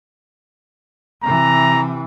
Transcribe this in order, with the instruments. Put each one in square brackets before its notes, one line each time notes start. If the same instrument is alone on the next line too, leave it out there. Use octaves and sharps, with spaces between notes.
[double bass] C3 E3 [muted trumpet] A#5